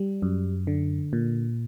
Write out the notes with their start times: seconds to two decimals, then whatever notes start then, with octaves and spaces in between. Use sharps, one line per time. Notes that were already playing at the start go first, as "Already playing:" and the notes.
Already playing: G3
0.22 F#2
0.67 D3
1.13 A#2